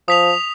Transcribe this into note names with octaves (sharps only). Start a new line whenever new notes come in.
F3 D#6 B6 F7